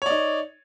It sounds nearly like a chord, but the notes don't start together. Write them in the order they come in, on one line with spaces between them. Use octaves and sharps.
C#5 D5 D#4